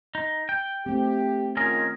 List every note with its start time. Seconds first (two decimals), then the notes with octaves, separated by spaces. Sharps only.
0.15 D#4
0.49 G5
0.86 A3 C4 G4
1.57 D#3 C#4 F4 G#4 A#4